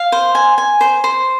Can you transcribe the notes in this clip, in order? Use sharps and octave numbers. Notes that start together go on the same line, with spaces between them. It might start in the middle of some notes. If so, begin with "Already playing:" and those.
Already playing: F5
C5
G#5
G#5
C5
C5